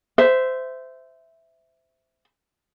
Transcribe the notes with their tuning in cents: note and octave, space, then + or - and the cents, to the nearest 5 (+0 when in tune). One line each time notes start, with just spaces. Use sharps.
C5 -20 E5 +0